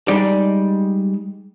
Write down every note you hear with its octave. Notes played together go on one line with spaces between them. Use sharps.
G3 G#3 D#4 D5